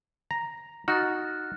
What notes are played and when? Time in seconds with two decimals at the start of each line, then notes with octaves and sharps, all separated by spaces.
0.31 A#5
0.88 D#4 F#4 F6 F#6 A6